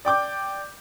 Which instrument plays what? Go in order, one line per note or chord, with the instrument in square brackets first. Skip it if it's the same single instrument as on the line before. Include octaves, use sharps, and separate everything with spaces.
[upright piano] D5 G5 D6 G6